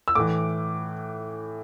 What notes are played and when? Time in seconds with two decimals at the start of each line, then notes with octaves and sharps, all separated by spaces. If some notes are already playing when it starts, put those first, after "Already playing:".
0.08 E6
0.15 A2 E3 D6